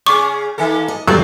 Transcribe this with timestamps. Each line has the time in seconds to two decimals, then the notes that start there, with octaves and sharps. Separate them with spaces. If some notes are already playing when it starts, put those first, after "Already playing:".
0.06 C#3 C#4 G#4 C#6 D6
0.58 D#3 A#3 A4
0.88 D#5
1.07 E2 F#3 G3 A3 C4 D4 F4 A4